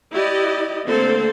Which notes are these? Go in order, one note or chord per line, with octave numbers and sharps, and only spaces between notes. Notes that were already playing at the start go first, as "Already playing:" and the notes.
E4 G4 D5 D#5
D3 A3 A#3 C4 A4 C5